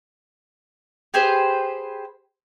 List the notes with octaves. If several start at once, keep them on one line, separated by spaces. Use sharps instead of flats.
G4 G#4 B4 C5